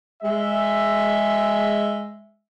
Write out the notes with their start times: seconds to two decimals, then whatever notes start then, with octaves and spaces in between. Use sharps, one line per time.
0.22 G#3 E5